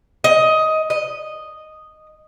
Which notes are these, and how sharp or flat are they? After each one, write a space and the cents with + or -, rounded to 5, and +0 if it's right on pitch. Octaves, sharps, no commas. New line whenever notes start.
D#5 +15
D#5 -5